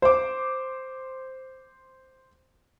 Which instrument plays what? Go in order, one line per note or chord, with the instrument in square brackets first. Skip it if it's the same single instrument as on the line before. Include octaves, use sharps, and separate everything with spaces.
[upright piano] C5 D6